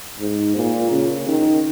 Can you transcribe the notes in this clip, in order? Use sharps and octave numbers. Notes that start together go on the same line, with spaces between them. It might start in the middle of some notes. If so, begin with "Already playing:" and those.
G#2
A#2
C#3
D#3